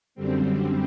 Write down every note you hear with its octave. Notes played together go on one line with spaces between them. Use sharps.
F#2 D3 G3 C4